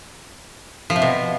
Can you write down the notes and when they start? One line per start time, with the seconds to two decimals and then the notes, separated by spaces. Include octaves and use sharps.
0.90 F3
0.96 C3
1.02 B2